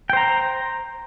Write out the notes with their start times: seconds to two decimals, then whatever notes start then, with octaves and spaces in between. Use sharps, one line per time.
0.10 G5
0.13 C5
0.17 A#5